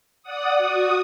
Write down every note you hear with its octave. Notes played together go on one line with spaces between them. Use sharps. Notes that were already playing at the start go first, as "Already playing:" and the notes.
D5 F#5 D#6
F#4 D#6